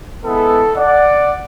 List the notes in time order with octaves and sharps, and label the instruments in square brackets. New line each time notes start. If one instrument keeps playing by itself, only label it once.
[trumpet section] G#3 B3 E4 A4
D5 F#5